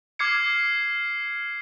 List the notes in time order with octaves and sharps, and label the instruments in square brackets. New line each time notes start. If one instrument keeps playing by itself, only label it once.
[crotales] D6 F6 G#6 C7 C#7